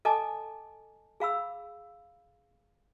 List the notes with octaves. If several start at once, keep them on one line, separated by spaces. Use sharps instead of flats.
A4 D#5 G#5 A5 D6
G#4 F5 B5 E6